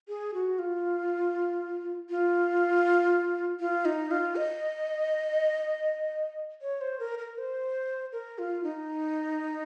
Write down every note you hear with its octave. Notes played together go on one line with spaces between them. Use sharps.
G#4
F#4
F4
F4
F4
D#4
F4
D#5
C#5
C5
A#4
A#4
C5
A#4
F4
D#4